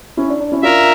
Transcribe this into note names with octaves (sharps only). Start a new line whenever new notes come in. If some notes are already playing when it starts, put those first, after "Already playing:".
C#4 E4
D4
D4
C#4 E4
D4 F4 A#4 E5